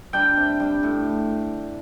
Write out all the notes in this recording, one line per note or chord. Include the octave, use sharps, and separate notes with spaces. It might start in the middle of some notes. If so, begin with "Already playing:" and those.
G3 D4 G5
C3
G3 D4
A2